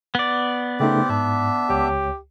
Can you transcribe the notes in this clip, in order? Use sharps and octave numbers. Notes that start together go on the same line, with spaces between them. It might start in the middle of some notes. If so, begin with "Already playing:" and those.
B3 D5
C#3 A3 C4 D#4 G4
G#2 D4 E5
C#2 G4 C#5